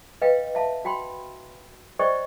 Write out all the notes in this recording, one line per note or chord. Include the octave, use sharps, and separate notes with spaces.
B4 D#5 F5 G5
E5 F5 A5
F#4 F#5 G5 B5 C6
C5 D5 D#5 G5 C#6